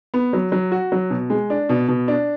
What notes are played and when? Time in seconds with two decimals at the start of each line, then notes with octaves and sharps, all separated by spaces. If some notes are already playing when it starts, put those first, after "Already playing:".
0.14 B3
0.33 F#3
0.52 F#3
0.72 F#4
0.92 F#3
1.10 B2
1.30 G#3
1.50 D4
1.69 B2
1.88 B2
2.08 D4